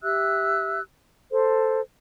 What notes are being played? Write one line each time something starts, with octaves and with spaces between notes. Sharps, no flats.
G4 E5 E6 F#6
A4 C5